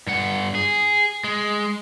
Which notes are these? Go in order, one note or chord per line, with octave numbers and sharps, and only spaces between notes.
G2 F#5
G#4
G#3